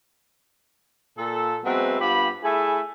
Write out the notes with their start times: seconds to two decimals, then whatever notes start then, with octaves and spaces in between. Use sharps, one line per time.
1.18 A#2 A4
1.64 F#3 G#3 B3 C4 B4 E5
2.00 G2 B3 F4 G4 B5
2.44 A3 E4 G#4 E5 G#5